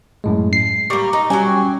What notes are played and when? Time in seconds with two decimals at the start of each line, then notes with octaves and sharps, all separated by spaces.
0.24 F#2 A2 G#3
0.53 C7
0.90 G3 A#3 C#6
1.13 D#4
1.30 F#3 G3 C#4 G4 G5 G#5